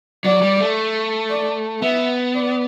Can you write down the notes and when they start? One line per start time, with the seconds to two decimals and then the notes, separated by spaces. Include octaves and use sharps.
0.25 F#3 D5
0.42 G3
0.59 A3
1.30 D5
1.82 B3 E5
2.34 D5